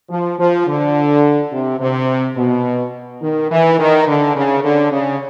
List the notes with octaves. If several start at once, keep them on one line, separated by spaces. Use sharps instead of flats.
F3
F3
D3
C3
C3
B2
D#3
E3
D#3
D3
C#3
D3
C#3